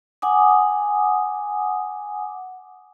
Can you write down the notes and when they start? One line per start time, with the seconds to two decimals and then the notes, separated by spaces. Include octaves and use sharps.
0.22 F#5 G#5 D6 D#6